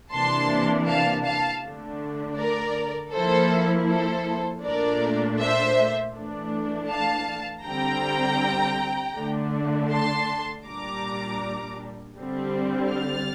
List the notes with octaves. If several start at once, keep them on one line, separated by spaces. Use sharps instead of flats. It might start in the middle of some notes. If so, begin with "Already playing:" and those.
C3 E3 A#3 D4 A5 C6
F5 A5
F5 A5
D3 A3 D4
A#4 D5
F3 A#3 E4 A4 C5
A4 C5
A#2 A3 D4 A#4 D5
C5 E5
E3 A3 D4
F5 A5
D3 G3 C4 G5 A#5
D3 A3 D4
A5 C6
A#2 G3 D4 A#5 D6
D3 G3 C4
F6 A6